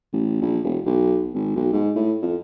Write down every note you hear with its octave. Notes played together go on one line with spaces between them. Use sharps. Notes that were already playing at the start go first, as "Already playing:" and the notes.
A1
A#1
E1
B1
G#1
B1
G#2
A2
F2